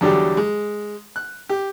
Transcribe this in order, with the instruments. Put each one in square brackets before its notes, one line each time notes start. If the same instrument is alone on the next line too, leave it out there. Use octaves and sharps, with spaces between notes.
[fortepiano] E2 D3 F#3 G3 G4
G#3
F#6
G4